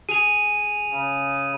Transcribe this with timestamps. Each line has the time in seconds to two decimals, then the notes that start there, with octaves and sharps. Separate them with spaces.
0.09 G#4 D#7 F7
0.90 C#3